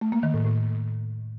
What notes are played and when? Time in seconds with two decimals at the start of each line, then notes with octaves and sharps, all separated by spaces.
0.01 A3
0.12 A#3
0.23 D#3
0.34 A2
0.45 A2